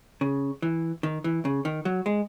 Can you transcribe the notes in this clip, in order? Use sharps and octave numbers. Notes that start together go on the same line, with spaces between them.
C#3
E3
D#3
E3
C#3
D#3
F#3
G#3